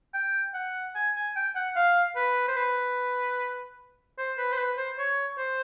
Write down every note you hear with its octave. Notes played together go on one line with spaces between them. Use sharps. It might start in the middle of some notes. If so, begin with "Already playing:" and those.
G5
F#5
G#5
G#5
G5
F#5
F5
B4
C5
B4
C5
B4
C5
B4
C5
C#5
C5